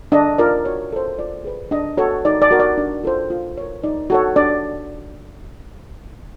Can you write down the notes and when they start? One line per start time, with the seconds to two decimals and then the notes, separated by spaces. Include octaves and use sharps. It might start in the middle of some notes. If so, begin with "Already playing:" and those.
0.12 D4 D#5
0.38 F4 A#4 D5
0.65 F#4 C#5
0.92 A4 C5
1.19 F4 D5
1.44 G#4 B4
1.71 D4 D#5
1.97 F#4 A4 C#5
2.25 D#4 D5
2.42 D5
2.51 F#4 A#4
2.60 D5
2.77 D4
3.04 F4 A4 C5
3.30 F4
3.58 A#4 C#5
3.83 D#4 D5
4.10 F#4 A4 C#5
4.36 D4 D5